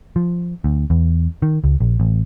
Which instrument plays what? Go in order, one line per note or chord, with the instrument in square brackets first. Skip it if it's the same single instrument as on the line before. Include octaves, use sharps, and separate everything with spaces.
[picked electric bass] F3
D2
E2
D#3
C#2
A#1
A1